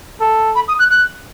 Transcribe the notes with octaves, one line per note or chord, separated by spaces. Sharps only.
A4
B5
D#6
F#6
F#6